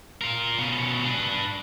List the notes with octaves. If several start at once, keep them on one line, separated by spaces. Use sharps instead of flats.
F4 A#4
B2 C#4
D4 B4